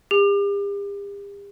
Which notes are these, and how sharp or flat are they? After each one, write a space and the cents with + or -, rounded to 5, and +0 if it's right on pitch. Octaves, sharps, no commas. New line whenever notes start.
G4 +45